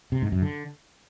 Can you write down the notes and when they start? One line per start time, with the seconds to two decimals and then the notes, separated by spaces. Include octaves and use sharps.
0.12 C3
0.22 G#2
0.32 F#2
0.42 D3